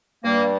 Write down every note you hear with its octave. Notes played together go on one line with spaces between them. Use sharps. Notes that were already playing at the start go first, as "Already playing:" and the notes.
G2 G3 A#3